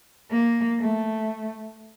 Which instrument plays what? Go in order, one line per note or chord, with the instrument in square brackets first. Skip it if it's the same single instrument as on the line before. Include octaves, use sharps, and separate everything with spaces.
[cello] A#3
A3